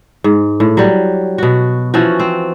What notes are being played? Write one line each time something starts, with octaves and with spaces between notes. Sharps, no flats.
G#2
A2
F#3 G3
B2 F#4
E3 F3 C#4 F#4
C4